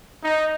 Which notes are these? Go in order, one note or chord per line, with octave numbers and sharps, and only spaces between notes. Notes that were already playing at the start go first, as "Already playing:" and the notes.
D#4